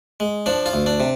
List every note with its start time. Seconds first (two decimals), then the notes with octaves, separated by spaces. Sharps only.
0.20 G#3
0.46 F3 D4
0.66 F4
0.73 D2
0.86 D4
1.00 C3